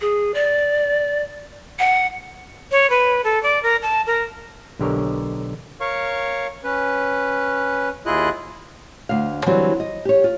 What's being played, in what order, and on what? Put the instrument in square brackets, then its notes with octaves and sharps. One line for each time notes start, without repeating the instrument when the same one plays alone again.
[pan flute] G#4
D5
F#5
[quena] C#5
B4
A4
D5
A#4
A5
A#4
[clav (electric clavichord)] B1 D3 G4 A#4 C#5
[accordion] A#4 C#5 F5 C#6
C#4 B4
D#2 E4 F4 G#4 D#5 F#6
[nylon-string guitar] D2 F5
D3 E3 F#3 G3 C4
D#5
G4 C#5
F4